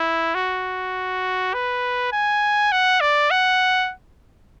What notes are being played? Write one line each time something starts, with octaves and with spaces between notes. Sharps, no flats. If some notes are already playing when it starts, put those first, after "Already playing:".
Already playing: E4
F#4
B4
G#5
F#5
D5
F#5